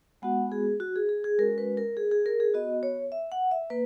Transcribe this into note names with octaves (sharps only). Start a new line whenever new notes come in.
G#3 B3 F#4 F#5
G#4
F#4
G#4
G#4
G#4
G#3 C#4 F#4 A#4
B4
A#4
G#4
G#4
A#4
G#4
B3 F#4 D#5
C#5
E5
F#5
E5
A#3 B4